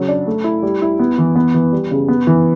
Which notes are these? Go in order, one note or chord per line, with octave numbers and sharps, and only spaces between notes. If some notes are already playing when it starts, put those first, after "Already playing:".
Already playing: C#3 F#3
D4
A3
E4
G3
E4
B3
E3
B3
E3
G3
C#3
B3
E3